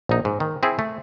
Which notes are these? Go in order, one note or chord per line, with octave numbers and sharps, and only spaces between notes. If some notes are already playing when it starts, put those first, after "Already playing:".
A#1 D#4
G#2
D#3
C4 E4 G#4
A3